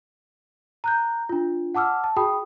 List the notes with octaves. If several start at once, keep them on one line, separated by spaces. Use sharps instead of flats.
A#5 F#6 G6
D4 F4
F#5 A5 D6 E6 F6
A5
F#4 G#4 G5 B5 D#6